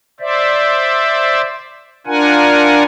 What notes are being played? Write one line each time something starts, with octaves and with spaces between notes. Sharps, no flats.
C5 D5 E5
D4 F4 A#4 F#5 G#5